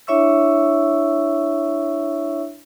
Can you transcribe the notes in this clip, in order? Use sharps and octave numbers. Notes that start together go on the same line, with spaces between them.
D4 E4 C#5 E5 C#6 E6